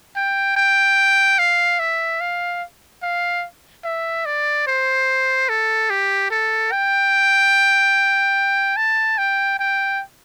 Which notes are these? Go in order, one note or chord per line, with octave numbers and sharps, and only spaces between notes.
G5
G5
F5
E5
F5
F5
E5
D5
C5
A4
G4
A4
G5
A5
G5
G5